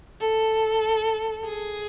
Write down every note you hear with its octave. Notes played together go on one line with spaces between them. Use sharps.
A4
G#4